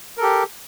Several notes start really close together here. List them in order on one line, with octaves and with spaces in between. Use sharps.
A#4 A4 G4